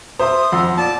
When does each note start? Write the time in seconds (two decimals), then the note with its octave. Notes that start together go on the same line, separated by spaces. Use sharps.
0.19 C5 E5 C6 D#6
0.52 F2 F#5 C6 E6
0.77 A#2 D5 A5